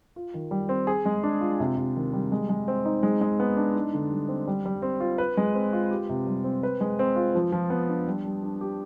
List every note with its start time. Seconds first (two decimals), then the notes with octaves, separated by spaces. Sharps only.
0.16 F4
0.34 D#3
0.51 G3
0.69 C4
0.87 G#4
1.06 G#3
1.23 D4
1.41 F4
1.60 C3
1.77 C3
1.96 D#3
2.13 G3
2.32 G#3
2.49 G#3
2.68 C4
2.85 D#4
3.03 G#3
3.21 G#3
3.40 B3
3.57 D4
3.75 D#4
3.94 D3
4.10 G3
4.28 C4
4.47 G3
4.66 G3
4.82 C4
5.00 F4
5.18 B4
5.37 G#3
5.54 C4
5.73 F4
5.91 G4
6.09 C3
6.27 G3
6.44 C4
6.63 B4
6.81 G#3
6.99 C4
7.16 F4
7.35 F3
7.52 F3
7.70 B3
7.89 D4
8.07 G3
8.25 G3
8.43 D4
8.61 G4